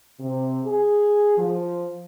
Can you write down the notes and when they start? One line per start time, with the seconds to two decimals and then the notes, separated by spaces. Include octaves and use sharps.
0.20 C3
0.66 G#4
1.37 F3